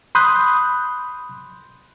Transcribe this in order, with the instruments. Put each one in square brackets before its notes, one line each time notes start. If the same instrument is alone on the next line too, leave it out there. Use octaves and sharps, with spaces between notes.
[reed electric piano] B5 C6 D#6 F#6 G6